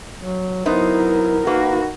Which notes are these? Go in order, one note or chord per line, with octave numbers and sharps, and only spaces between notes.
F#3
F#3 B3 D#4 E4 A#4 C5
A#3 D#4 F#4 B4